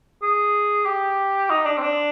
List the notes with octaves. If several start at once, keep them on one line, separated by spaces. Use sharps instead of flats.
G#4
G4
D#4
D4
C4
D4